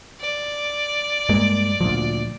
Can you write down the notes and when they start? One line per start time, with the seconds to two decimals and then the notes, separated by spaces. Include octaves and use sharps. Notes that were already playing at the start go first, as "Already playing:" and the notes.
0.20 D5
1.29 G2 G#3 A#3
1.80 D2 A#2 F3